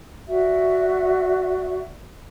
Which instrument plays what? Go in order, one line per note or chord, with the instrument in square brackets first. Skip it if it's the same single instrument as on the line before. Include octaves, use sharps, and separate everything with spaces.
[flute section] F#4 D5 E5